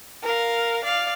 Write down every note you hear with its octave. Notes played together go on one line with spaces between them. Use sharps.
A#4 F5
D5 F5